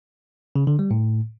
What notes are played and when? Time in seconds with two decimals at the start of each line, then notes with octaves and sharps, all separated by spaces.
0.56 C#3
0.67 D3
0.79 G3
0.91 A2